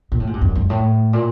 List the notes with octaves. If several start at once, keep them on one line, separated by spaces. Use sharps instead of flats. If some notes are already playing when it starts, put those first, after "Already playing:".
A#2
A2
G#2
G2
F#2
G#2
A2
A#2